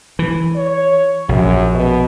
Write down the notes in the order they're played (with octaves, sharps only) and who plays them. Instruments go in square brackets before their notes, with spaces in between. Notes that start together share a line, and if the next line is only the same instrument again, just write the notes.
[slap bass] E3
[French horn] C#5
[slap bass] A#1 [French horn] F#2
[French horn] B2